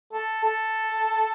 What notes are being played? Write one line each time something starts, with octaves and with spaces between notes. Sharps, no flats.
A4
A4